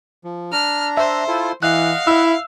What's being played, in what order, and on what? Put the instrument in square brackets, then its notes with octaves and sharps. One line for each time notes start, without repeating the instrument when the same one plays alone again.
[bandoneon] F3
[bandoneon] D4 A#5 [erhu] F6
[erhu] C5 [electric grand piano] E5
[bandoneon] E4 F4 A4
[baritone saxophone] E3 [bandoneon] D#5 F#5 [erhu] F5 [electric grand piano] F#6
[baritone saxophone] E4 [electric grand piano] E5 E6